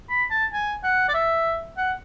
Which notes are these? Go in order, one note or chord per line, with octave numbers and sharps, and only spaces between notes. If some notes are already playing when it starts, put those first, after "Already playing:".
B5
A5
G#5
F#5
D5
E5
F#5